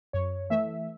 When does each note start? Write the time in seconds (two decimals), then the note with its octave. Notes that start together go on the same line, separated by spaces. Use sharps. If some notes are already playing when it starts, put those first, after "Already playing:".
0.13 F#2 C#5
0.50 E3 A3 E5